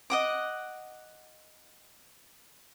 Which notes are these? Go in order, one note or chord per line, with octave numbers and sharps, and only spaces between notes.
D#5 F#5 D6